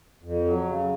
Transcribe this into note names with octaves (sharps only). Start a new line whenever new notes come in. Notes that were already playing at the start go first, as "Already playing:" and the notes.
F2
F#3
C#3